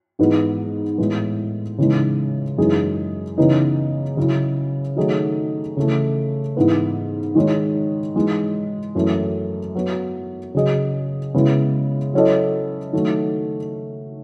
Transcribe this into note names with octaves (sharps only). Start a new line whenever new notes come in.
G#2 E3 G#3 B3 D#4
A2 E3 G#3 B3
C#3 E3 G#3 D#4
F#2 E3 G#3 D#4 G#4
C#3 E3 B3 D#4
C#3 F#3 C#4 E4
D#3 F#3 A3 D#4 G#4
C#3 E3 A3
G#2 E3 B3 E4
D#3 G#3 D#4 G#4 C#5
E3 G#3 D#4
F#2 E3 A3
F#3 B3 F#4
C#3 F#3 C#4 G#4 D#5
C#3 G#3 B3 E4
F#3 C#4 E4 A4 D#5
D#3 F#3 A3